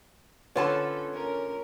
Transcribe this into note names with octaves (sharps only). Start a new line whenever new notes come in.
D3 C#4 F4 A4 B4 C#5 F#5 A5
C#4 A#4